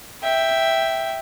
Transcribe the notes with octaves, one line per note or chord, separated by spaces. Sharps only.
E5 G5